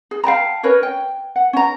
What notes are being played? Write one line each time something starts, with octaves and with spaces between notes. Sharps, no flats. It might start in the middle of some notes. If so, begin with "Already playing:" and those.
G#4
F5 G5 A5 A#5
C#4 A#4 B4 C#5
G5
F#5
C#4 A#5